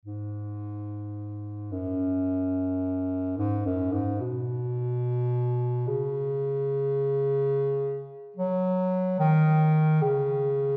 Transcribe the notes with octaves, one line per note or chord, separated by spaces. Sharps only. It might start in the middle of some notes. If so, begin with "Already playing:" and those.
G#2
F#2
G#2
F#2
G#2
B2
C#3
F#3
D#3
C#3